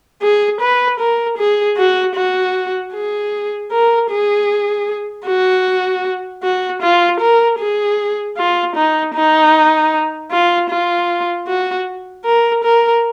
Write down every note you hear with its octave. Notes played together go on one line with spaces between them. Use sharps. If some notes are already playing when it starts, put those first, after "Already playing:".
G#4
B4
A#4
G#4
F#4
F#4
G#4
A#4
G#4
F#4
F#4
F4
A#4
G#4
F4
D#4
D#4
F4
F4
F#4
A#4
A#4